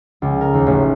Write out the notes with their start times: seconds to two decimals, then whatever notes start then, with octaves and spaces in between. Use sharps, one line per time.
0.22 C#2
0.41 A#4
0.54 D#2
0.67 A1